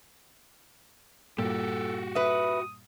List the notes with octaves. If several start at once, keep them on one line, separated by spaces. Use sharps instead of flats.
G2 A#2 F#4 G4 A4
B4 E5 D#6